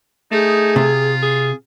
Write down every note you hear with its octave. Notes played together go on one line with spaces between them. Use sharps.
A3 D#4 G#4
C3 F4
G#4